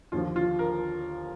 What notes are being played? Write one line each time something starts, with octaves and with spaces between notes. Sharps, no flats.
D#2 D3 F3 F4
F4
A#4